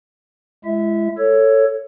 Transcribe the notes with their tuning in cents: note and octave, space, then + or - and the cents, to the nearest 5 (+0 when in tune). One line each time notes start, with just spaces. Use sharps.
G#3 +10 E4 +40 E5 -15
A4 +15 C#5 +0